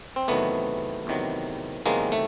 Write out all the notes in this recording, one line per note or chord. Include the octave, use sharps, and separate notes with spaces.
C4
E2 C3 D#3 F#3 A3 B3
E2 C3 D#3 F#3
E2 C3 D#3 F#3 G#3 A#3
A3